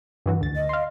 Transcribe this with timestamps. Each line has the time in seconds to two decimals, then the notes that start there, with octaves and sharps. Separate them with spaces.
0.26 G2 E3 F#4
0.41 D2 A6
0.56 D#5
0.69 F5 C6